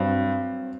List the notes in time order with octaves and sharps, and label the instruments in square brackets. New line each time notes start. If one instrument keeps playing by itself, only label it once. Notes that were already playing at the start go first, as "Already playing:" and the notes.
Already playing: [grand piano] G2 [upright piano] F#3 C4